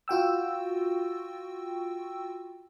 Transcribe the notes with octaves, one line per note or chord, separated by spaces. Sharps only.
F4 F#4 G5 E6